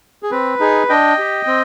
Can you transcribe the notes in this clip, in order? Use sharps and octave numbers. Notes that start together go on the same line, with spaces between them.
G#4
C4 B4
D#4 G#4
D4 D#5 G5
G4
C4